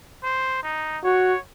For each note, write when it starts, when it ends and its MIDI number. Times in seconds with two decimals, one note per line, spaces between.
0.23 0.60 72
0.63 0.98 63
1.04 1.35 66
1.04 1.39 73